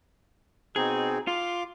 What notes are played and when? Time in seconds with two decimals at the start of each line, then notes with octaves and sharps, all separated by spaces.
0.76 B2 C4 D#4 G#4
1.27 F4 C6 D6